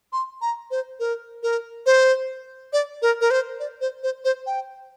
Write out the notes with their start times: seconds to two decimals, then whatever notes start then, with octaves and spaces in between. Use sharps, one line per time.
0.13 C6
0.42 A#5
0.71 C5
1.00 A#4
1.43 A#4
1.86 C5
2.73 D5
3.02 A#4
3.21 A#4
3.31 C5
3.60 D5
3.81 C5
4.03 C5
4.25 C5
4.47 G5